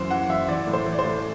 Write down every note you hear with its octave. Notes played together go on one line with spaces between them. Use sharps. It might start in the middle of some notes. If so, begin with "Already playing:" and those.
Already playing: F#2 E3 C5
E3 F#5
F#2 E5
E3 D5
A2
C5
E3
D5
C5
A2